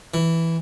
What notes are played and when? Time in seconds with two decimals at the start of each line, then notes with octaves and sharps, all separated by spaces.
0.14 E3